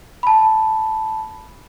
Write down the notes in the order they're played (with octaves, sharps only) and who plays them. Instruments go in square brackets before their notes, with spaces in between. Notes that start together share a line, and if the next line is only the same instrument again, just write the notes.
[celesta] A5 B5